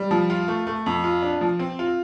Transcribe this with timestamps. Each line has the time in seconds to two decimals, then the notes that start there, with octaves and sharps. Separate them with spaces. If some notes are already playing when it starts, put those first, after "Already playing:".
Already playing: G3
0.11 F3
0.30 F4
0.48 A3
0.67 A3
0.86 F2
1.04 F4
1.22 D4
1.41 F3
1.59 C4
1.79 F4